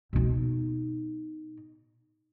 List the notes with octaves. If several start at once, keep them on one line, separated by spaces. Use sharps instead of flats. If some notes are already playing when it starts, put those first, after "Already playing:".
B2 D#4